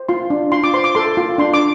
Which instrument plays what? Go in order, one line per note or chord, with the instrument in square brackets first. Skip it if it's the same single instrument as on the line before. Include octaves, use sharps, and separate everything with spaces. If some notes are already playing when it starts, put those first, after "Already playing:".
Already playing: [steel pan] C5
F4 C6
D4
F4 C6
D6
C5 C6
D6
A4 C6
F4
D4 C6
D6